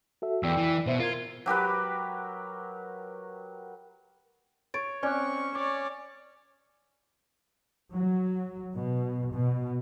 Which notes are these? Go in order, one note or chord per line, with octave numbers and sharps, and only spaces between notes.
F#4 A4 E5
E2 D5 G5 E6
E3
B2 C5 E5
F4 A#4 G#6
F#3 G4 A#4 B4
C#5 A6 D7
C4 C#4 D5 C#6 D6 F#6
C#5 D5 D6
F#3
B2
B2